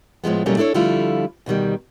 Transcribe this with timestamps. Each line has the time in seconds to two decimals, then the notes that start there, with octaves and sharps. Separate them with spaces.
0.24 A2 F3 G#3 B3
0.46 B2 F#3 G3 A3 A#3 C#4
0.57 D4 E4 A4 C5 C#5
0.74 D3 F3 G3 A3 E4 F4
1.46 D2 B2 D#3 G3